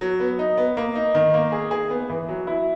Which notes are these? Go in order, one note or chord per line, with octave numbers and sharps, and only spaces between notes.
F#3
B3
D#4
B3
A#3
D#4
D#3
A#3
G#4
G#4
B3
E3
F#3
E4